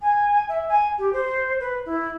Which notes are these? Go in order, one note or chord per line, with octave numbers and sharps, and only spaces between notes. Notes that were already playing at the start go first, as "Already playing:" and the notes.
G#5
E5
G#5
G4
C5
B4
E4